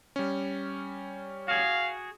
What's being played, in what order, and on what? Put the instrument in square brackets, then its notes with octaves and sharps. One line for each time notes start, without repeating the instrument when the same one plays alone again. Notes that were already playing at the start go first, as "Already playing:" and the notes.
[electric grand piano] G3 C#4
[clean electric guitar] F#4 G#4 [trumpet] F5